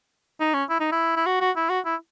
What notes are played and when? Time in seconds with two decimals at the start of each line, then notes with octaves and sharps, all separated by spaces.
0.40 D#4
0.54 C#4
0.70 E4
0.80 D#4
0.92 E4
1.17 E4
1.26 F#4
1.41 F#4
1.56 E4
1.70 F#4
1.85 E4